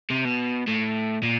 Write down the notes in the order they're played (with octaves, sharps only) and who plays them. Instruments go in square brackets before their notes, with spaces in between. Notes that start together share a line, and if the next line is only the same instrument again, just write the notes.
[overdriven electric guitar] C3
B2
A2
A#2